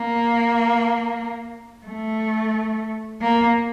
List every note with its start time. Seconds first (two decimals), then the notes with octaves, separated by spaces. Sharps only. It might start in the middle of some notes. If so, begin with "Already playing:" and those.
Already playing: A#3
1.86 A3
3.21 A#3